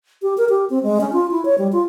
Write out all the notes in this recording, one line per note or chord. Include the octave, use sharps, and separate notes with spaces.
G4
A#4
G4
C4
G#3
C#4
F4
E4
C#5
G3
F4